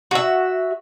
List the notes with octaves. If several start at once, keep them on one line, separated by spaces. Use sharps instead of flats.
F#4 E5